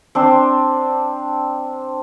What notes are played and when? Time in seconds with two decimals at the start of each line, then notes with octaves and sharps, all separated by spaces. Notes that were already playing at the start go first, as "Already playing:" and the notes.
0.15 C4 D4 C6